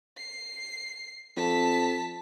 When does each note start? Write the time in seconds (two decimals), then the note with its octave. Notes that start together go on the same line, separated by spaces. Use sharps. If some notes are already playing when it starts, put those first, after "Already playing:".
0.17 C7
1.37 F2 A5 B6